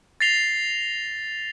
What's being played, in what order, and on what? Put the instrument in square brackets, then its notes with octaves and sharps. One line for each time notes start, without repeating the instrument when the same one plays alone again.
[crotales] A6 A#6 C7 F7 G7